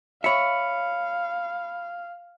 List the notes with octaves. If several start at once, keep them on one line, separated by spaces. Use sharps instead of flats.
C#5 E5 F5 B5 C#7